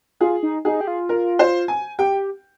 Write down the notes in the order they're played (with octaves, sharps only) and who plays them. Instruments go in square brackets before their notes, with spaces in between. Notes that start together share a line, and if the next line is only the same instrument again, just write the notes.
[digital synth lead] F4 [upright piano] G#4
[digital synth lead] D#4
[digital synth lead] D#4 [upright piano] G#4
[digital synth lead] G4
F4
[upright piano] A#4
C5
G#5
[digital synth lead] G4 [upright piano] G5